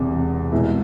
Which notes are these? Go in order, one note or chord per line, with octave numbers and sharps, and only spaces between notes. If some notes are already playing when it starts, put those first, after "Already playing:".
Already playing: E1 E2 C3
C2 B2 G#3 E4